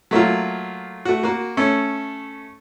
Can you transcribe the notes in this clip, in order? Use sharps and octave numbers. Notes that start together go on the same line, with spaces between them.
F#3 A3 A#3 F4
A3 F#4
A#3 F#4
A3 C#4 A4